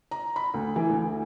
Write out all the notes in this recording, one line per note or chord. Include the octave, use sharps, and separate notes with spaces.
A#5
B5
D2
E3
D2